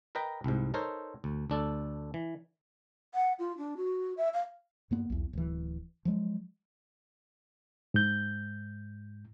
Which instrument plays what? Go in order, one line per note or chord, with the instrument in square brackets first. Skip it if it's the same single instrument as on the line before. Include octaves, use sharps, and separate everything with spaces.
[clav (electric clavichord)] A#4 B4 D#5 G5 A#5
C2 G#2
D#4 A4 A#4 C5 C#5
D2
D2 D4 A4
E3
[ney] F#5
F4
D4
F#4
E5
F5
[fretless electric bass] G2 A#3 B3
B1 E2
D1 E3
F3 F#3 G#3
[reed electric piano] G#2 G6